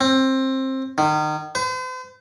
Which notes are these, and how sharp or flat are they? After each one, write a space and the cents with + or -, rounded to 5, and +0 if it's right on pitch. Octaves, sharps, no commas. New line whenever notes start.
C4 +20
D#3 -30
C5 -45